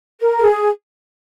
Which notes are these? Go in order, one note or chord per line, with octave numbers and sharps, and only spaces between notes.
A#4
A4
G#4